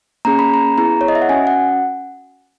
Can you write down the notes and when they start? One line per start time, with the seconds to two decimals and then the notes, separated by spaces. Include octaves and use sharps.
0.25 A#3 C#4 G#4 A#5
0.39 B5
0.54 A#5
0.78 B3 E4 G#4 A#5
1.01 C#5
1.08 D#5
1.15 E5
1.22 F#5
1.29 C#4 F#4 G#5
1.47 F#5